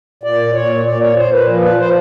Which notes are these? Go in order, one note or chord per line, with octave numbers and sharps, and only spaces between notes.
A#2 D5
A#2 C#5
A#2 D5
C#5
A#2 C5
B4
F3
B4
F3 C5